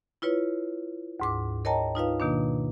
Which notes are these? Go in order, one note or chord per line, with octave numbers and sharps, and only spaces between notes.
E4 F4 B4 C#5
D2 G#2 D6
A#4 C#5 D#5 G5 A5 A#5
D#4 F4 B4 F5
B2 D#3 A#3 D4